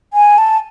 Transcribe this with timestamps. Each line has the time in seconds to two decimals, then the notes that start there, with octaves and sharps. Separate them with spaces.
0.13 G#5
0.38 A5